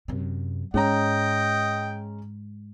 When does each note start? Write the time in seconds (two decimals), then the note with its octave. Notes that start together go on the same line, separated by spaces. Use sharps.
0.08 F#2 C3
0.74 G#2 G#3 C#4 D#5 G5 A#5